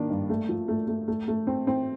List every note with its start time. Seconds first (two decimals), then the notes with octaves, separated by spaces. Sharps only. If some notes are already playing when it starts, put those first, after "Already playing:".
Already playing: D#3 A#3 D4
0.10 G2
0.30 A3
0.49 F3
0.68 A3
0.88 A3
1.08 A3
1.28 A3
1.47 C4
1.67 C4